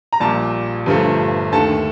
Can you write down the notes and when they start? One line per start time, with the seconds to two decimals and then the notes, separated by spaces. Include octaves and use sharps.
0.13 A#5
0.20 A#1 A#2 G3 A5
0.86 G1 G2 F3 A3
1.52 D#2 D3 A3 A5